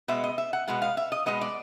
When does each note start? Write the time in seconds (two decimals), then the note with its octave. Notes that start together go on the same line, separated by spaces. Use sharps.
0.08 B2 G#3 B3 E5
0.24 D#5
0.38 E5
0.53 F#5
0.68 B2 G#3 B3 F#5
0.82 F5
0.97 E5
1.12 D#5
1.26 B2 G#3 B3 D#5
1.41 D5